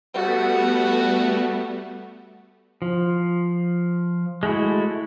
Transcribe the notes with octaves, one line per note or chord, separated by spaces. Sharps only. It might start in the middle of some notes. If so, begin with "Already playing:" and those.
G3 A3 B3 F#4
F3
G#3 A3 E4 F#4